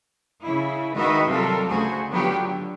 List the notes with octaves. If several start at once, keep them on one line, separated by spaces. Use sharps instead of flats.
C#3 E4
D#3 G#3 F#4 B4 D#5 E5
C3 F#3 G3 F4 A4 A#4
D2 C#3 A3 F#4 G#4 C5
D3 F#3 B3 F4 G4
D3